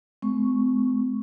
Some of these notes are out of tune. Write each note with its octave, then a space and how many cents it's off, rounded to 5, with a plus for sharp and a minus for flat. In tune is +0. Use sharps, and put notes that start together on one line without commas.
G#3 +45 C4 -40 C#6 +0